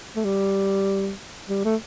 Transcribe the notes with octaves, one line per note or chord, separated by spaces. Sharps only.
A3
G3
G3
A3